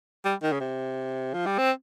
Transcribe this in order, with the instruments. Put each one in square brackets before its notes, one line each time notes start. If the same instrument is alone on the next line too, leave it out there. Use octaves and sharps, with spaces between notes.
[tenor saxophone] G3
D#3
C#3
C3
F3
G3
C4